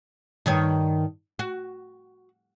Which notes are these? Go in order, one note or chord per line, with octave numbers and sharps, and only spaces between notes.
G2 D#3 C#5
F#4